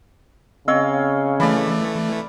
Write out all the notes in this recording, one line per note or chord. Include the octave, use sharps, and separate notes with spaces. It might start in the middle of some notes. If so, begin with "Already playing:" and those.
C#3 C4 C#5 D#5 F5 E6
E3 A3 D5 B5